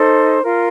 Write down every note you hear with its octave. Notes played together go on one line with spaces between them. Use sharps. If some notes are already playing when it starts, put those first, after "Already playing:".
Already playing: D#4 A4 C5
F4 A#4